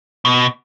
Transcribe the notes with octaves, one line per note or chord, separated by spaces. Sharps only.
B2